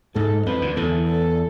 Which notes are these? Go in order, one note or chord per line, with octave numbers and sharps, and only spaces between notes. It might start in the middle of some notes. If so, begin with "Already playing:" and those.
G#2 G#3 A4
F2 F3 B4
D2 D3
E2 E3 A4
A4